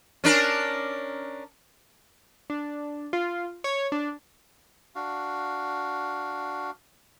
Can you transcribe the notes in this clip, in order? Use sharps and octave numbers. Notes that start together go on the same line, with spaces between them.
C#4 D4 A#4
D4
F4
C#5
D4
D4 F#4 F5